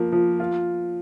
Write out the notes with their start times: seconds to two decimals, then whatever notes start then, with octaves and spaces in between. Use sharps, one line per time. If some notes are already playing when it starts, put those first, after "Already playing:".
Already playing: F3 A#3
0.12 F3
0.40 F4